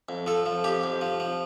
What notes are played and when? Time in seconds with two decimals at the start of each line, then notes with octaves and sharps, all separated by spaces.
0.09 F2
0.26 F3 A4
0.46 F3
0.64 F2 G4
0.84 F2
1.01 F3
1.20 F3